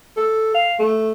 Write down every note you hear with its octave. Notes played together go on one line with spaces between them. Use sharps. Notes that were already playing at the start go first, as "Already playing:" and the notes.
A4
F5
A3